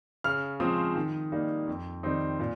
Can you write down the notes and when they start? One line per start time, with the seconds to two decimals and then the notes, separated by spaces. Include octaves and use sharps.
0.24 C#3 F6
0.60 F3 G#3 C4 D#6
0.96 D#3
1.32 G3 A#3 D#4
1.68 F2
2.03 D#3 G3 C4 D#4
2.39 A#2